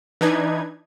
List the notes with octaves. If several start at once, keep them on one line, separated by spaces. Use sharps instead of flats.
E3 D4 D#4 B4 G#6